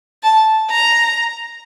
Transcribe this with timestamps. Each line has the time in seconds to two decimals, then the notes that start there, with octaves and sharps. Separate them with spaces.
0.23 A5
0.70 A#5